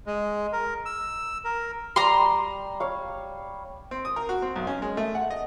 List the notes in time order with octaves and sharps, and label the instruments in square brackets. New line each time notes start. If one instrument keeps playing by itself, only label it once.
[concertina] G#3
A#4
E6
A#4
[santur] G3 [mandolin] A#5 C6
[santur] C#5 F5
[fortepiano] C4
D#6
A#4
F#4
C4
B1
C#4
G#3
A3
F#5
D#5